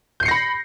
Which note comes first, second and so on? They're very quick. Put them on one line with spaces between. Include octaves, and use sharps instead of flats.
G6 C7 C#7 A#6 B5